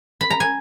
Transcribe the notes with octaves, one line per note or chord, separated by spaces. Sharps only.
B5
A#5
G#5